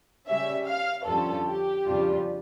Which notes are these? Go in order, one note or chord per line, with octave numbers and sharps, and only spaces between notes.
C#3 G3 C#4 E5
F5
F2 D3 G3 C#4 F4 A4
G4
F2 C#3 G3 D4 F4